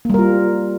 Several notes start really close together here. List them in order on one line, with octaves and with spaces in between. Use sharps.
A#3 G3 A#4 F4